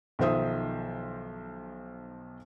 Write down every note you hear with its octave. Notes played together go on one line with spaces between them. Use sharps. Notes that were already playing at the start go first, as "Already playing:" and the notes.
B1 D#3 F3 C5 E5 D#6